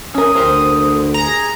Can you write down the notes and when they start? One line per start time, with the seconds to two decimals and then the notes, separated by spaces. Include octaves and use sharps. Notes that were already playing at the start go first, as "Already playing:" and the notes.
0.14 C#4 A#4 D#6
0.35 D2 G4 A#4 C5
1.14 G#4 A#5